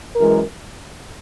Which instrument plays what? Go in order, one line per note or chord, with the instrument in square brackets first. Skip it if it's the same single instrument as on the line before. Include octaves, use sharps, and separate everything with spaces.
[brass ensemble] F#2 E3 G#3 A#4